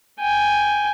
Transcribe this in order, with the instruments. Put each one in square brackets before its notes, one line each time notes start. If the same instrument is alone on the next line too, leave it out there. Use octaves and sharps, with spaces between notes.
[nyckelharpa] G5 G#5